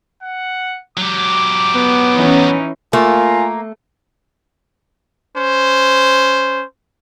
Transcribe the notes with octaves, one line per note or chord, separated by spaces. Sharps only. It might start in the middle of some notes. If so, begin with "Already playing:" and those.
F#5
F#3 G4 D6
B3
E3 C#4 D#4
A3 A#3 F4 G#5
C#4 C5